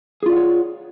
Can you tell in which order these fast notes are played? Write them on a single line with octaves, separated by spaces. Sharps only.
G#4 F4 D5 F#5 C#5